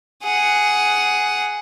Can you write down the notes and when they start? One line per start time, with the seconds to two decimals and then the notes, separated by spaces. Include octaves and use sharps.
0.24 G#4 F#5